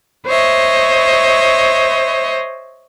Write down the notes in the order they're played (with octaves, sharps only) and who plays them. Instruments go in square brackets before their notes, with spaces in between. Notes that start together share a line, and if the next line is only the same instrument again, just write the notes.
[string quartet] C5 C#5 D#5 E5